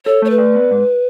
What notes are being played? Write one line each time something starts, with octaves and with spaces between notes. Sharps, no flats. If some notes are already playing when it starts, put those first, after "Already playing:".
A4 C#5
A3 C#5
B4
D5
B3
G#2